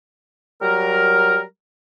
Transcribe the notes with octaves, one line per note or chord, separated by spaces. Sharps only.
F#3 G3 A#4